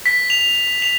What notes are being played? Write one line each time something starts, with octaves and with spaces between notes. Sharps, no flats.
B6
F7
F7